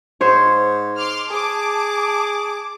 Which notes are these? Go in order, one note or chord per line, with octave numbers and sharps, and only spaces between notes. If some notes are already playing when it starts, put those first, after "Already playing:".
G#2 C5 C#5
C6 D6 F6
G#4 A5 D6